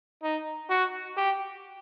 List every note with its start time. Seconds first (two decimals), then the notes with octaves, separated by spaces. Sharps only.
0.23 D#4
0.70 F#4
1.17 G4